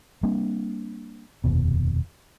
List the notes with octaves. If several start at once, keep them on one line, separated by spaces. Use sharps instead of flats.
G3 A#3 C4 D4
F1 D#2 B2